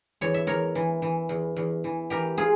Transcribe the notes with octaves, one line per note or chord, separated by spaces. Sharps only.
E2 C#5
E5
E2 A#4 C#5
E3
E3
E2
E2
E3
E3 G4 A#4
F4 G#4